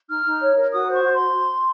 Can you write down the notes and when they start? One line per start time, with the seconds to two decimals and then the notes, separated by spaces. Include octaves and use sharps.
0.10 D#4 F6
0.26 D#4
0.41 C#5
0.57 A#4
0.73 F#4 D#6
0.88 C5
0.93 C#6
1.03 F#4
1.13 C6